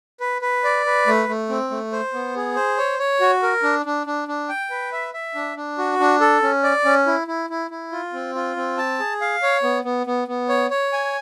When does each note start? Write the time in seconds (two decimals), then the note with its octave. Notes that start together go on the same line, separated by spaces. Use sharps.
0.20 B4
0.42 B4
0.64 D5
0.86 B4
1.07 A3
1.29 A3
1.49 C4
1.71 A3
1.92 C5
2.13 B3
2.36 G#4
2.56 C5
2.78 C#5
2.99 C#5
3.21 F#4
3.43 A#4
3.63 D4
3.86 D4
4.07 D4
4.28 D4
4.49 G5
4.70 B4
4.92 E5
5.14 E5
5.35 D4
5.57 D4
5.78 F#4
6.00 D4
6.20 A4
6.42 C#4
6.64 D5
6.85 C#4
7.07 E4
7.27 E4
7.50 E4
7.71 E4
7.92 F4
8.13 C4
8.35 F4
8.56 C4
8.78 A5
9.00 G#4
9.21 F5
9.43 C#5
9.63 B3
9.84 B3
10.07 B3
10.28 B3
10.49 C#5
10.70 C#5
10.93 G#5